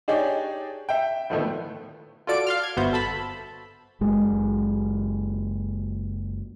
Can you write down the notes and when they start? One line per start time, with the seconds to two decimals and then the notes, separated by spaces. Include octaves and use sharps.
0.08 D4 D#4 G4 G#4 C#5 D5
0.89 E5 G5
1.30 D2 A2 D#3 F3 A3 B3
2.27 F4 F#4 A4 D5 D7
2.47 F5 C6 F6
2.63 G#6
2.77 G1 B3 F#4 C5 E5 G6
2.93 A4 A5 B5
4.01 F#1 G#3